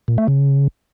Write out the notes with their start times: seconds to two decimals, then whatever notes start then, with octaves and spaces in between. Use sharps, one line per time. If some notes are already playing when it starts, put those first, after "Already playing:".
0.08 A#2
0.18 A3
0.28 C#3